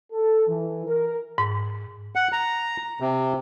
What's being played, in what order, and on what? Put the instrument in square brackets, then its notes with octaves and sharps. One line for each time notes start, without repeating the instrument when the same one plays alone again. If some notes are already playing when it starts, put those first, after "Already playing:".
[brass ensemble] A4
E3
A#4
[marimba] G#2
[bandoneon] F#5
A#5
C3